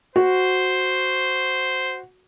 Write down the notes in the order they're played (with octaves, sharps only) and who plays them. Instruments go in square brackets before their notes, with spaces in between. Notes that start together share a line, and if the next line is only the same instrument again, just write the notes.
[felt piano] F#4 [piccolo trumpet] C5